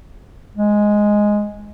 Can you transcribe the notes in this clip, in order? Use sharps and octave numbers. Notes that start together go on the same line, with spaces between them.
G#3